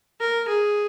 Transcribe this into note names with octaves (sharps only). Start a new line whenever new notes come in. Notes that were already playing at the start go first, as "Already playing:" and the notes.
A#4
G#4